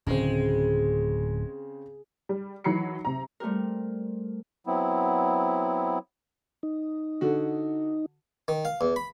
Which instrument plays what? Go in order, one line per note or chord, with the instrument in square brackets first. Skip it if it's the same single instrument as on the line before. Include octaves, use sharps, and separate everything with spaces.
[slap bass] D1 [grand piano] C#3 C4 [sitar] G#3
[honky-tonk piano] G3
D#3 E3 F#3 B5 C7 C#7
C3 A#5
[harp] G3 A3 C4 G4 A#4
[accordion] F#3 B3 C4 E4
[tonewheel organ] D#4
[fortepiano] D3 F#4
[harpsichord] D#3
F5
E2
B5